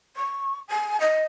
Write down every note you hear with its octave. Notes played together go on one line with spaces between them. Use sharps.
C#6
G#5
D#5